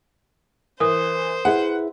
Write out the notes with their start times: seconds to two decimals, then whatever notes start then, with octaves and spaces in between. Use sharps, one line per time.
0.80 E3 A#4 C5 D#6
1.45 E4 G#4 B4 F#5